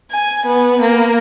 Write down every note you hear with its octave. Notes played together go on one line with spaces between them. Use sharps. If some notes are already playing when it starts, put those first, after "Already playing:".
G#5
B3
A#3